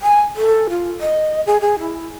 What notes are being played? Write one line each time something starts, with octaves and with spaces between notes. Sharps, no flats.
G#5
A4
F4
D#5
G#4
G#4
E4